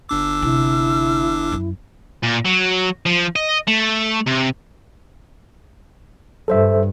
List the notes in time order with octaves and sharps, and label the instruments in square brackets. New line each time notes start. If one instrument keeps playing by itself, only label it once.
[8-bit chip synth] G1 D4 D6 [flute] E6
[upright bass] C3 [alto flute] E4
[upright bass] F#2
[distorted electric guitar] A#2
F#3
F3
D#5
A3
C3
[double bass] G2 [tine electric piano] A4 C5 E5